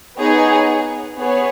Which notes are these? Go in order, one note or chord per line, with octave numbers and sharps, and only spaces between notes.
B3 D#4 G#4 C#5
B3 G#4 C#5